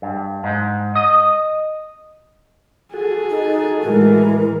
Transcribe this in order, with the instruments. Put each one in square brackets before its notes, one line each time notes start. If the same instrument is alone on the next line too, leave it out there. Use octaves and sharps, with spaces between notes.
[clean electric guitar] G2
G#2
D#5
[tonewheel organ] F#4 A4 [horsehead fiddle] G#4
[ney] D#4
[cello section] A2 E3 G#3 [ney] A#4